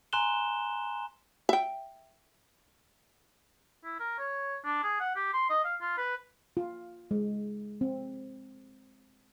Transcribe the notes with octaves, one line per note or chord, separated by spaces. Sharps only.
G#5 A#5 C6 F#6 E7 G7
E5 G5
E4
A#4
C#5
D4
G#4
F#5
G4
C6
D#5
F5
F4
B4
F4
G#3
C4